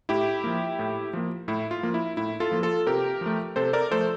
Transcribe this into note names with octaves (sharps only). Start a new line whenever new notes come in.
A2 E4 G4
F3 A#3
A2
F3 A#3
A2 E4
F4
F3 A#3
E4
A2 E4
F4 A4
F3 A#3
F4 A4
C3 G4 A#4
F3 A3
C3 A4 C5
A#4 D5
F3 A3 A4 C5